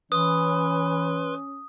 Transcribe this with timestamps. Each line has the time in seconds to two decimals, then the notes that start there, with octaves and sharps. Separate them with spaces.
0.12 E3 C#4 B4 C6 D#6